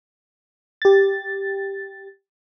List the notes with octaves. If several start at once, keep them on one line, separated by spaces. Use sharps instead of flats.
G4 A6